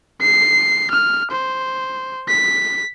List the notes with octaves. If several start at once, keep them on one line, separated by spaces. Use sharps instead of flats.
C7
F6
C5
B6